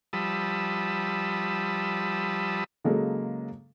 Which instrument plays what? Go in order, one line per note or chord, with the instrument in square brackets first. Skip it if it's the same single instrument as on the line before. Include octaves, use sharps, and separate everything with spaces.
[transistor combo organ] F3 G3 A5 B5 D#6 E6
[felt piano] C#3 F#3 G#3 A#3 A4